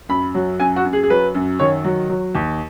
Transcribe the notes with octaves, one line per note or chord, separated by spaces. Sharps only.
F#2 B5
F#3
F#2 G#5
F#4
F#2
G#4
G#4
F#3 B4
F#2
D#3 C#5
F#3
F#3
D#2